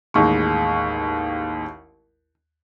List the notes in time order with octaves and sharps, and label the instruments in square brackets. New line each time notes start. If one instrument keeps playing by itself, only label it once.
[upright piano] A1 D#2 G#3 C#6